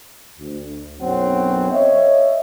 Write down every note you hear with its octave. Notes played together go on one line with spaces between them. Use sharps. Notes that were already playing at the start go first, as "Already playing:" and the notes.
D2
B1 F#2 F#3 C4 F#5
C#5 D#5 E5